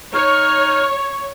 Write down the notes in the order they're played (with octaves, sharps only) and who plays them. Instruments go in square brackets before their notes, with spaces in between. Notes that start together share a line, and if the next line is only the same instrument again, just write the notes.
[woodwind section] D#4 F6 [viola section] C#5 [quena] C#6